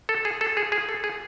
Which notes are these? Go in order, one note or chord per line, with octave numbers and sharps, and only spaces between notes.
A4
G#4
A4
G#4
G#4
A4
G#4